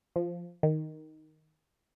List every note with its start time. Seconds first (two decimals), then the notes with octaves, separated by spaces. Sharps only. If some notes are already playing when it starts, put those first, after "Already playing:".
0.16 F3
0.63 D#3